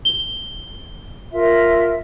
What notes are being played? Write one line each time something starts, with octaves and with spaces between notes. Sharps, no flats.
G7
F4 A#4 E5